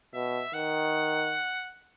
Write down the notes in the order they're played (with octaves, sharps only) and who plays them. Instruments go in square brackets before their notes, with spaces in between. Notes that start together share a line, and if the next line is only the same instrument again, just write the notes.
[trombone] B2 [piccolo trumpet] E5
[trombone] D#3 [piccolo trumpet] F#5